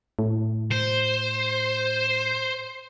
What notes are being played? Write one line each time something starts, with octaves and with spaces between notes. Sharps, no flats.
A2
C5